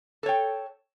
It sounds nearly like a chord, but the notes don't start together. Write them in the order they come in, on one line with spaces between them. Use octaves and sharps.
A4 C#5 G5